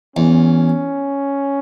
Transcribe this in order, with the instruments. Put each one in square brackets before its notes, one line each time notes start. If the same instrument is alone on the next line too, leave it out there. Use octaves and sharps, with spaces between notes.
[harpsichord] E2 [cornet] C#4